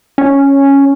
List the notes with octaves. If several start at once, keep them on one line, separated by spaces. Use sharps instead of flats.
C#4